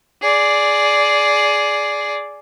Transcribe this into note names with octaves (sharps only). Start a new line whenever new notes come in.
G#4 D5